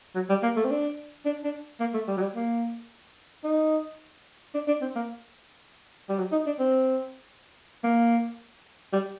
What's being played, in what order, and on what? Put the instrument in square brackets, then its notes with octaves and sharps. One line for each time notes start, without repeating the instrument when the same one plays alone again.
[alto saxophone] F#3
G3
A#3
A3
C4
D4
D4
D4
A#3
A3
G3
F#3
G3
A#3
D#4
D4
D4
C4
A#3
G3
F#3
D#4
D4
C4
A#3
G3